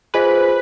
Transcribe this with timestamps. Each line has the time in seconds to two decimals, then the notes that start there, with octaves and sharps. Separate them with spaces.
0.14 F4 G#4 B4 C5 D#5 G#5